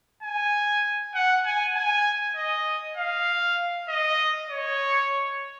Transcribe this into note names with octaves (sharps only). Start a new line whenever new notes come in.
G#5
F#5
G#5
G#5
D#5
F5
D#5
C#5